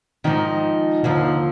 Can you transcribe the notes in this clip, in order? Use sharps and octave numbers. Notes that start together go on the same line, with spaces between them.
G#2 D#3 F3 D#4
D#2 D3 F3